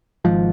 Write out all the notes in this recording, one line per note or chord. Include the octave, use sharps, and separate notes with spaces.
G#1 G#2 F3